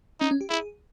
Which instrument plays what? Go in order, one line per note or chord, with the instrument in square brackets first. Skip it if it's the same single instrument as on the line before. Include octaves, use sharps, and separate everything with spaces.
[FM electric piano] C#4 [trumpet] D#4
[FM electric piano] C#4
G4
[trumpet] E4 [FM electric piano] G#4